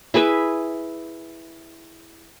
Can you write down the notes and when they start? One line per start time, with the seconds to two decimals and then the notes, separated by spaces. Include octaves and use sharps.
0.14 E4 G#4 B4 E5